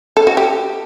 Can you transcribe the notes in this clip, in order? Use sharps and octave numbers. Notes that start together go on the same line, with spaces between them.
A4
F#4
G4